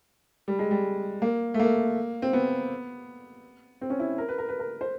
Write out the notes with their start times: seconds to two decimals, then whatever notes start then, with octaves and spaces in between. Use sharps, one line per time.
0.48 G3
0.59 G#3
0.71 G3
1.22 A#3
1.54 A3
1.60 A#3
2.22 C4
2.33 B3
3.81 C4
3.90 C#4
4.00 E4
4.18 A#4
4.29 B4
4.38 A#4
4.49 B4
4.60 A#4
4.81 C5